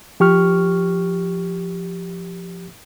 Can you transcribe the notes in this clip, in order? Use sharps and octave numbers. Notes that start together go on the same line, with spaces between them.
F3 G4 C#6 F6